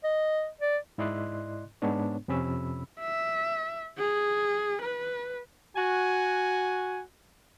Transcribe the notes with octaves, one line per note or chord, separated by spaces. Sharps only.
D#5
D5
G#2 E4 D5 D#5 C6 F#6
G#2 G#3 B3 D4 C#5
F2 C3 C#4 B5 E6
E5
G#4
B4
F#4 G#5